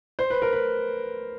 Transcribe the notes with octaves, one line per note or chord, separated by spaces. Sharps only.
C5
B4
A#4
B4